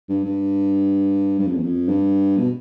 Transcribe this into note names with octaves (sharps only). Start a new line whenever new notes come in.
G2
G2
G2
F2
E2
F2
G2
B2